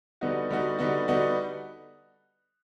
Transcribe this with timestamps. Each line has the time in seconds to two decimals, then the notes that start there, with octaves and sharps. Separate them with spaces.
0.21 D3 G3 B3 D#4 F#4
0.50 D3 G3 B3 D#4 F#4
0.79 D3 G3 B3 D#4 F#4
1.08 D3 G3 B3 D#4 F#4